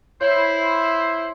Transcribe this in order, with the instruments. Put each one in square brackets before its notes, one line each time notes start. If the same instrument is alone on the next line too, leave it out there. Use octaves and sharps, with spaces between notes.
[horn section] E4 C5 [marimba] C#5 G6